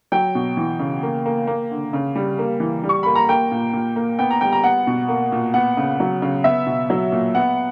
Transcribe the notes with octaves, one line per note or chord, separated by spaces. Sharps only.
F#3 G5
B2
E3
C#3
A#3
A#3
A#3
D3
C#3
G3
A#3
E3
G3
C#6
A#3 B5
A#5
A#3 G5
A#2
A#2
A#3
B3 G5
A#5
G3 G5
A#5
B3 F#5
B2
A#3
A#2
B3 F#5
C#3
F#3
C#3
B3 E5
B2
F#3
A#2
B3 F#5